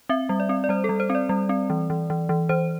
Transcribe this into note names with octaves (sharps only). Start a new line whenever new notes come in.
C4 E5
G3
D5
C4
D5
G3 C5
A4
G3
C5
C4
D5
G3
C4
E3
E3
E3
E3
E3 C5